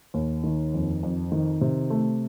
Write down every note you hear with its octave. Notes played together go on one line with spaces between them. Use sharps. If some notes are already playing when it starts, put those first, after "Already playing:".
D#2
D#3
F2
F2
D#3
C3
A3